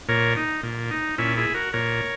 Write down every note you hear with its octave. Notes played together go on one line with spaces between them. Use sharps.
A#2 A#4 C#5
D#4
A#2
D#4
A#2 C#4 E4
E4 G#4
F#4 A#4
A#2 A#4 C#5